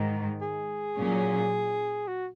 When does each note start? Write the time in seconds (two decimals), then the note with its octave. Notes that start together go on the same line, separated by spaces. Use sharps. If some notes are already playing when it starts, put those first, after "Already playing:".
Already playing: G#2 D#3
0.41 G#4
0.96 A#2 F#3 C#4
2.08 F#4